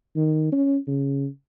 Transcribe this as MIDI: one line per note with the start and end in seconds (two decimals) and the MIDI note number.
0.16 0.47 51
0.52 0.77 61
0.87 1.27 49